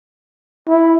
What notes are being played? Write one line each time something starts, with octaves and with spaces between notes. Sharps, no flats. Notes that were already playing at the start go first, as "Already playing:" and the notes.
E4